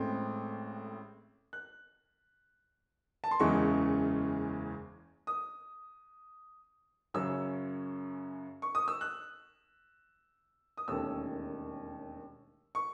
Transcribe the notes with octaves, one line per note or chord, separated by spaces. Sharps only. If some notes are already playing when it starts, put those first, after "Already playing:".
Already playing: A1 A2 G#3 C4
F#6
A5
C6
F#1 E2 C#3 E3 G#3 C#6
D#6
F#2 C#3 F#3 C#4 E6
C#6
D#6
E6
F#6
D#6
E1 D#2 D#3 A3 C#4 E6
C#6